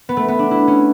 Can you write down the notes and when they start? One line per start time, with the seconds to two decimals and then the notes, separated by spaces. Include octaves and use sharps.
0.09 B3
0.17 A3
0.28 B3
0.39 D4
0.51 E4
0.67 C#4